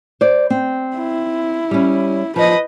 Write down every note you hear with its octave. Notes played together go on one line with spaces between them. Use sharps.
C5 D5
C4
E4
G3 C#4
F3 B4 D#5